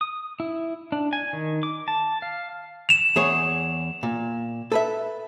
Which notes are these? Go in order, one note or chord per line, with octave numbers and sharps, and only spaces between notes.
D#6
E4
D4
G#5
D#3
D6
A5
F5
E7 F7
E2 G#4 C#5
A#2
A4 B4 E5